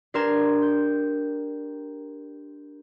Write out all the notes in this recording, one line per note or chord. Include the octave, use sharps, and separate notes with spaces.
D4 G4 A#4 C6 G#6 E7
G6